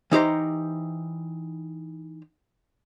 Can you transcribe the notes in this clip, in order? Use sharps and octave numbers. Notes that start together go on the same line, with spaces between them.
E3 D#4 G4 C5 A#5